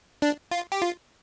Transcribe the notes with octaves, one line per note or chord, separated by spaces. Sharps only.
D4
F4
G4
F4